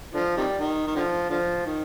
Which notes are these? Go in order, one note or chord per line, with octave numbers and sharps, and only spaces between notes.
D3 F3
C3 D#3 G3
D#3
D#3
D3 F3
D3 F3
D#3